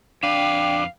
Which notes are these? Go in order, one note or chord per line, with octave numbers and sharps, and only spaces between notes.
F2 D4 B4 F5 G5